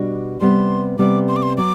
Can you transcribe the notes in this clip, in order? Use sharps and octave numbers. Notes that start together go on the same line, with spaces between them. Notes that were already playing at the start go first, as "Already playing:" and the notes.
Already playing: B2 G3 D4 F#4
C3 G3 B3 C6
C3 G3 B3 D6
C6
D6
C6
F#3 D6